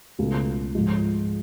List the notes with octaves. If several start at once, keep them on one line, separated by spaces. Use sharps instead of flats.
C#2 B2 A3
G#2 F3 G#3